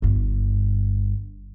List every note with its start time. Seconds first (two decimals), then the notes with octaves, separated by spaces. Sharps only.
0.02 G1 G2